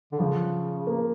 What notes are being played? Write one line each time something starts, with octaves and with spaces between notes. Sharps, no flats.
D3
C#3 F3
A#3